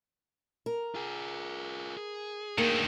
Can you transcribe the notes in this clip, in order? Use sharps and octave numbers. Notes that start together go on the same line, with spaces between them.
A#4
F4 G#4
G#4
D2 D#3 A#3